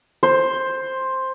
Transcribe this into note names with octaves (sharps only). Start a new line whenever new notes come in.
C5